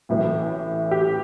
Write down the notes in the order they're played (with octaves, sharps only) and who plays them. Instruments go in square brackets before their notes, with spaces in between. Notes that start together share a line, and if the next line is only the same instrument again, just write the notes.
[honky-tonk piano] A1 A2 E3
G4